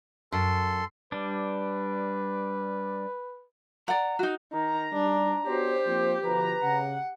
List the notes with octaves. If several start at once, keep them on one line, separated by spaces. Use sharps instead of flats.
F#2 A4 C6
G3 D4 B4
D5 F#5 A#5
D#4 F#4
D#3 A#5
G3 D4
B3 F#4 G4 C5 C#5
F3 A#3 C4
B2 D3 F3 B4 A#5
C#3 F#5